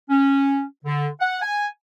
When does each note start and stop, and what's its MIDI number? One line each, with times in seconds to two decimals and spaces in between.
0.10 0.63 61
0.85 1.07 50
1.21 1.41 78
1.42 1.67 80